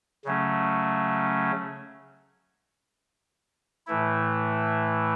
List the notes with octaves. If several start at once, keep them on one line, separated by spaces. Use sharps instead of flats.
C#3 F#3 A3 C#4
A2 E3 A3 E4